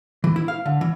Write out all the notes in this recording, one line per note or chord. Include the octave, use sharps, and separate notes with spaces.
E3
E4
F5
D3
E3